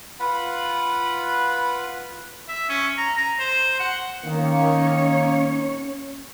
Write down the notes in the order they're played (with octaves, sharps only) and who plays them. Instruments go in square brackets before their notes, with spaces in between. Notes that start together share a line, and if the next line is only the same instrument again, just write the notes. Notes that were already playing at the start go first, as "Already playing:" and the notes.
[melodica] F4 B4 F#5 B5
[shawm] E5
C#4
A#5
A#5
C5
F#5
[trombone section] D#3 A#3 [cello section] C#4 C#5